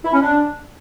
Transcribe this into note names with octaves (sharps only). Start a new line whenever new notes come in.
E4
C#4
D4